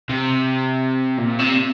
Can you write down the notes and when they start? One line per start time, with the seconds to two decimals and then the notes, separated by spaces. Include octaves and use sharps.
0.10 C3
1.18 A#2
1.39 C3